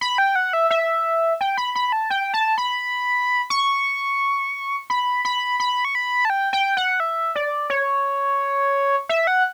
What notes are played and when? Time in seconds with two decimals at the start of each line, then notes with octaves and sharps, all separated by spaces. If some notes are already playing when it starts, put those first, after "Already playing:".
0.01 B5
0.18 G5
0.36 F#5
0.53 E5
0.70 E5
1.41 G5
1.57 B5
1.75 B5
1.92 A5
2.10 G5
2.34 A5
2.58 B5
3.50 C#6
4.90 B5
5.25 B5
5.60 B5
5.85 C#6
5.95 B5
6.25 A5
6.30 G5
6.53 G5
6.77 F#5
7.00 E5
7.35 D5
7.70 C#5
9.09 E5
9.27 F#5